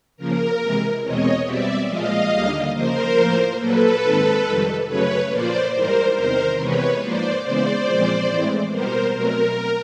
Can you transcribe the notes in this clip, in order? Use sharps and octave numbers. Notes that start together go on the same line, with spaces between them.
C#3 F3 A#3 A#4
C3 E3 G#3
E2 B2 G#3 C4 C#5 D#5
B2 G3 C4 D5 E5
A#2 F3 G#3 D#5 F5
D#2 D3 G3 A#3
C#3 F3 A#3 A#4 C5
A2 F3 A#3
A#2 F#3 A#3 A4 B4
G#2 D#3 G#3 C4
F2 C3 D#3 G3
F#2 C#3 F#3 A3 B4 C#5
A#2 F3 A#3 C5 D5
G#2 E3 G3 A#4 C5
E2 C3 D#3 A#4 C5
C3 E3 G#3 B3 B4 C#5
G#2 F3 A#3 C5 D5
C#3 E3 G#3 B3 C5 D5
A#2 F3 G#3 C4
A2 E3 G#3 C4
B2 G3 B3 A#4 C5
B2 F#3 A3 C4 A#4